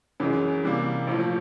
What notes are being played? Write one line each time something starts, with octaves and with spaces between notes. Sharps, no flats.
F#2 C#3 E3 G#3
C3 E3 G3 A#3
A#1 A2 F3